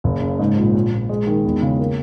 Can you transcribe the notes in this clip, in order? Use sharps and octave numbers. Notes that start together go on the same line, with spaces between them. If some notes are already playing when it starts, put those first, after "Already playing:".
F#1
C#3
G#2
A#1
A#1
A#1
G#3
D#3
E2
C#3
A#3